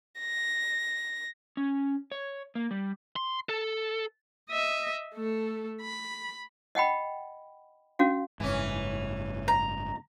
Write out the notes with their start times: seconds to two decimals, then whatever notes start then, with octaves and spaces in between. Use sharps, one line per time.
0.20 A#6
1.57 C#4
2.12 C#5
2.55 A#3
2.71 G3
3.16 C6
3.49 A4
4.51 D#5 E5
5.15 A3 A4
5.82 B5
6.75 D#5 F#5 G5 B5
7.99 C#4 F#4 F5
8.40 F#1 G#2 E3 C#4
9.48 A#5